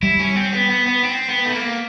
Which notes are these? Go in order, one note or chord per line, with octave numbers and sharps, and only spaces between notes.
G3 E4
C#4
C4
B3
B3
B3
C4
B3
A3
A#3